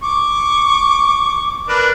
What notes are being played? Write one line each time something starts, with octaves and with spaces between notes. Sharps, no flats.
C#6 D6
D4 A#4 B4